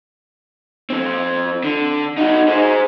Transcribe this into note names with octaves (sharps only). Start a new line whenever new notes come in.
F2 C4
D3
D#4 F#4
G#4 C5